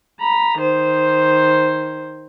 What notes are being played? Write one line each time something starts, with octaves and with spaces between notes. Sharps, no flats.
A#5 B5
D#3 C5